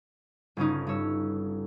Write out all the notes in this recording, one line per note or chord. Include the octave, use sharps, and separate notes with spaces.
G1 C#3 C#4 D#4
G2 C#4 C#5 E6